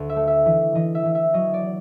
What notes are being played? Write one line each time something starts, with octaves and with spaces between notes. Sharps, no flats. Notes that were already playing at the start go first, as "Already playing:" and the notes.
Already playing: D2
E5
A3
E5
E3
E3 D#5
E5
E3
E5
F#3 D#5
D5